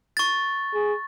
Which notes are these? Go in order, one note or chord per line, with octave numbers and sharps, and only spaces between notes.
C#6 A6
G#4